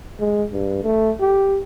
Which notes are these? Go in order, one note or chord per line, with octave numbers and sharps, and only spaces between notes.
G#3
G2
A3
G4